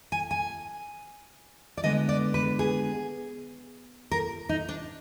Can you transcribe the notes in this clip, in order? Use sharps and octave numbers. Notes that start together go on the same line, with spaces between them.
G#5
G#5
D5
D3 G#3 B3 D4 D#5
D5
B4
G#4
A#4
D#4
D4